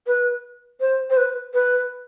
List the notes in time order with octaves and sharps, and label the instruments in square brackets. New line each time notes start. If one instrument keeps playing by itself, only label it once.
[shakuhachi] B4
C5
C5
B4
B4